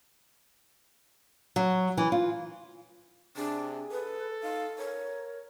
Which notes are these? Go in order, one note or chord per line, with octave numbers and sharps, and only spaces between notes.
F#3
E3
F4
C3 D4 G#4
A4 B4
D#4 F5
A#4 C#5